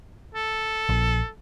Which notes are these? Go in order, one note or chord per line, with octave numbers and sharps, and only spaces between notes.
A4
A#1